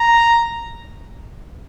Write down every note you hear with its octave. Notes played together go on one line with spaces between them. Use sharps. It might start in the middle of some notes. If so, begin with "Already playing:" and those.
Already playing: A#5